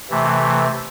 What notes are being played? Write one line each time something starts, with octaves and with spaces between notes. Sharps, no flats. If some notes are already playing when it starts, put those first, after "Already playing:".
C3 E3 A3